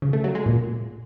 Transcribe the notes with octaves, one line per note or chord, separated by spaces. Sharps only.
C#3
A3
F#3
G#3
A#2